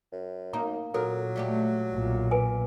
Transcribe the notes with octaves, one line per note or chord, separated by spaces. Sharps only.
F#2
A#3 D#4 A#5
A#2 F#3 A4 A#4
G3 A3 G4
B1 A#2
B4 G#5